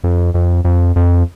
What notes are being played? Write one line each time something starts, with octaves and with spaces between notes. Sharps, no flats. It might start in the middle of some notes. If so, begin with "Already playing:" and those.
F2
F2
F2
F2